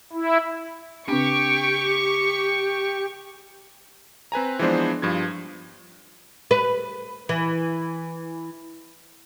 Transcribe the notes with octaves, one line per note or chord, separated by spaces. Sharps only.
E4
C#3 C4 D4 G4 C#6
C4 B4 G#5 A#5
E3 F3 G#3 B3 D4 C5
G2 F3 G#6
B4
E3